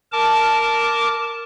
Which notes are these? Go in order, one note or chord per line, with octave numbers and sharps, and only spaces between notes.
A#4 A5 D6